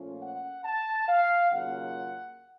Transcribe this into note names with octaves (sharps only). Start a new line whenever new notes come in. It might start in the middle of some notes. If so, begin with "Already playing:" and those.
Already playing: A#2 F3 A3 C#4 F4
F#5
A5
F5
D#2 C#3 F#3 A#3 F4 F#5